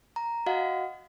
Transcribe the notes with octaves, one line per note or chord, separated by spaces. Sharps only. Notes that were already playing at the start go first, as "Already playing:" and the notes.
A#5
F#4 D#5 F5 F#5